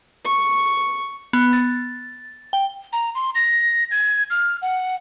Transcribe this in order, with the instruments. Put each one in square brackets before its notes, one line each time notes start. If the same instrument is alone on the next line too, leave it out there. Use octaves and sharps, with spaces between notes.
[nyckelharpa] C#6
[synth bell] B3
A6
G5
[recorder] A#5
C6
A#6
G#6
F6
F#5